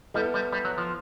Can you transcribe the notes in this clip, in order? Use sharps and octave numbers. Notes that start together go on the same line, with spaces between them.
G3 B3 E4 A4
G3
G3
F#3
F3